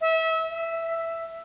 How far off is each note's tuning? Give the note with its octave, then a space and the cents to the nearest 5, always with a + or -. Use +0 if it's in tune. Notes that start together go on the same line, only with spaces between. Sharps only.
E5 -30
E5 +5